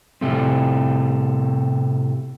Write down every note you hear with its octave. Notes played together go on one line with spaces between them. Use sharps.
A2 C3 A3 C4